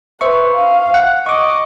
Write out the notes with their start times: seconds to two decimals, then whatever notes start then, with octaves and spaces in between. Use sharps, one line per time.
0.21 B4 C5 E5 C#6
0.55 F5
0.94 F#5
1.26 D#5 C#6 D6